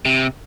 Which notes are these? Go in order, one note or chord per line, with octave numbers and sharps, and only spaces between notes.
C3